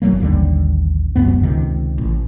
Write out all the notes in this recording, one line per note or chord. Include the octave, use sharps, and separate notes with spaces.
F#1 E2 F#3 A#3
A1 D#2 D3 G3
E1 C#2 F#2 B3
C#2 C3 D#3
A1